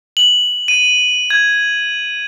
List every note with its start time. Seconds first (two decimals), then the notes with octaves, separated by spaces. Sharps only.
0.17 F#7
0.68 D#7
1.30 G#6